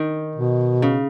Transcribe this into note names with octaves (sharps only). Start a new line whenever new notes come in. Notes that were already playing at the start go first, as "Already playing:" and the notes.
Already playing: D#3
B2
C#3